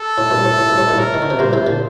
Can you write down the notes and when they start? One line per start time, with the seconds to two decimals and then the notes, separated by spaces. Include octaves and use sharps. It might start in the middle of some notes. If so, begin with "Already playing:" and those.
Already playing: A4
0.18 A2
0.30 G2 A#2
0.45 A2
0.58 A2
0.69 G2
0.78 A2
0.89 G2 A#2
0.98 A2 A#4
1.14 D#3
1.22 D3
1.30 C3
1.39 G2 A#2 C5
1.53 A2 C3
1.67 A#2 D3